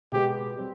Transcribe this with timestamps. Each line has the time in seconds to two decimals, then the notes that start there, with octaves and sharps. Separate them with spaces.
0.12 B2 G#3 B3 G4
0.58 G3 C4